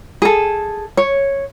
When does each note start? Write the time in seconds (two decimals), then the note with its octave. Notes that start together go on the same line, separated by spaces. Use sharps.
0.22 G#4 A4
0.97 C#5